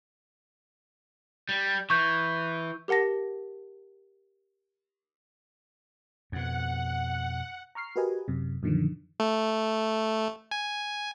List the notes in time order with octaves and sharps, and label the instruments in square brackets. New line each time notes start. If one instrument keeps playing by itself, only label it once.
[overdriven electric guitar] G3
[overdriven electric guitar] E3 [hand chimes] C#6 G6
[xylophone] G4 A#4 F#5 A5 A#6
[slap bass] F2 B2 [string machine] F#5
[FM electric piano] A#5 C#6 F6 C7
F#4 G4 A#4 B4 D#5 G#5
F#2 C3
F#2 A#2 D3 D#3 F3
[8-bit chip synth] A3
G#5